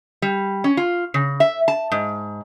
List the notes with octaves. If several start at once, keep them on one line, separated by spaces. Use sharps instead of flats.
G3
C#4
F4
C#3
E5
A5
G#2